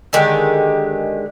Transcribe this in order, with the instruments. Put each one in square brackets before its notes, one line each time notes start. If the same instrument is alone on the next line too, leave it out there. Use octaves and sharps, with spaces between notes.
[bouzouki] D3 D#3 G#3 G4